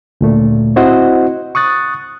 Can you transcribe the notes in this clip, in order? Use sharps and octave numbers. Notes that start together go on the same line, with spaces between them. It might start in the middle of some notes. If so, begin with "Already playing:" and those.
D2 A#2 A3
C4 E4 F#4 C5 D#5 F#5
C#6 D#6 F#6 A6